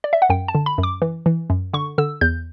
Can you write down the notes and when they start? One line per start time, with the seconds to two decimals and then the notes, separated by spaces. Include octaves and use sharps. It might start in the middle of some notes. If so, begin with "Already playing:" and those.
0.04 D5
0.13 E5
0.22 F#5
0.29 F#2 G5
0.48 A5
0.55 D3
0.66 B5
0.78 F#2
0.83 D6
1.02 E3
1.26 E3
1.50 F#2
1.73 D3 C#6
1.98 D3 E6
2.21 E2 G6